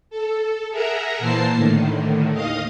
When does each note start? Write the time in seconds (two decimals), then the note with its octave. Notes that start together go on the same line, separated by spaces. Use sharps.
0.10 A4
0.70 G#4 A#4 E5 F#5 A#5
1.19 A#2 E3 A#3 C5 A5 C7
1.55 A2 D3 D#3
2.32 D#2 D#5 F5 D#6